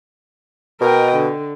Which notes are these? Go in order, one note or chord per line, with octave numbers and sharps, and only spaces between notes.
B2 A#4 D#5 G5
D3